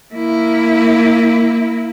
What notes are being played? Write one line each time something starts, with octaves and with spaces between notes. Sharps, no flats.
A#3 E4